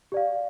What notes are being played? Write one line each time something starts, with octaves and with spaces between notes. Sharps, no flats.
G4 D5 F5